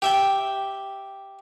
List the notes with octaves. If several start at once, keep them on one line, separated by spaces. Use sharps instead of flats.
G4 E5 G5